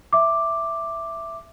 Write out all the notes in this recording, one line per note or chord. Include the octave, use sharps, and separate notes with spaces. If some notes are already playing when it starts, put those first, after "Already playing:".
E5 D6